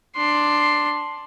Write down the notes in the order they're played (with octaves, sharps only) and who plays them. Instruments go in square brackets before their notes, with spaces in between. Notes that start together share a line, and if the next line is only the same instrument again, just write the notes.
[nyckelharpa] D4 C6